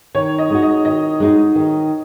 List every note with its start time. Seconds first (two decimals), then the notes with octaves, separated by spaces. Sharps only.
0.15 D#3 C#5
0.38 D#5
0.50 G#3 D#4 F#4
0.62 D#5
0.85 D#3 D#5
1.20 G#3 D#4 F#4
1.55 D#3